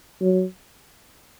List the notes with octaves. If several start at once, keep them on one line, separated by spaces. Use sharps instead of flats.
F#3